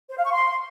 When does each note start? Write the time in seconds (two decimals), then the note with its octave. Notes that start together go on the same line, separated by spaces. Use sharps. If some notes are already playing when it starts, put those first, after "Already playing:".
0.09 C5
0.17 F5
0.25 C#6
0.32 C6